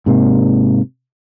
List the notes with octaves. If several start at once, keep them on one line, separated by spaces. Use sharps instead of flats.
G#2 C3 A#3